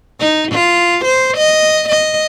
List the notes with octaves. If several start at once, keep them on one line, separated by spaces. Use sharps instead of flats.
D#4
F4
C5
D#5
D#5